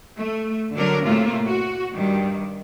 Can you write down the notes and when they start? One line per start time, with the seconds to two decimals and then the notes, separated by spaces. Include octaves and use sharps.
0.18 A3
0.74 D3 F#3 D4 A#4
1.06 A2 C3 A3 A#3 F4
1.47 F#4
1.95 G2 D#3 G3